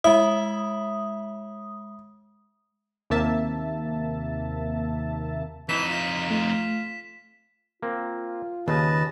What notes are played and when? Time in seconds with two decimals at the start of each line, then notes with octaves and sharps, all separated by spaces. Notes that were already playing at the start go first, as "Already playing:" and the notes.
0.04 G#3 E4 D#6
3.10 D#2 C3 A#3 E5 A5
5.69 F2 E3 D#4 B6 E7
5.90 F4
6.31 A3 F4
7.82 A#3 C4 F4
8.68 D#2 C#3 B4 D#5 A5